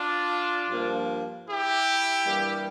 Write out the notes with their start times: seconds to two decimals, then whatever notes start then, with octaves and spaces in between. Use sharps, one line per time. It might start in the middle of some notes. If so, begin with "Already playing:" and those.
Already playing: D4 F4
0.70 G2 F3 A#3
1.48 E4 G4
2.25 G2 E3 G3 A#3